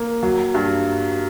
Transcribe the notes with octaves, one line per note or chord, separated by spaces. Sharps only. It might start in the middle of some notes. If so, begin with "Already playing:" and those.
Already playing: A#3
F#3
G2